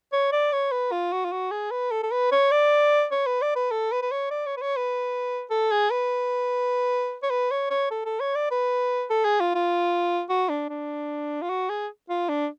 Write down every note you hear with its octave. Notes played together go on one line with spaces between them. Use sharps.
C#5
D5
C#5
B4
F4
F#4
F4
F#4
G#4
B4
A4
A4
B4
C#5
D5
C#5
B4
D5
B4
A4
B4
B4
C#5
D5
C#5
B4
C#5
B4
A4
G#4
B4
C#5
B4
C#5
C#5
A4
A4
C#5
D5
B4
A4
G#4
F4
F4
F#4
D4
D4
F4
F#4
G#4
F4
D4